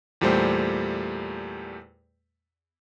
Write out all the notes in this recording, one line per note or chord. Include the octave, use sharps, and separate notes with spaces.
E2 A#2 G3 A3 C5 G5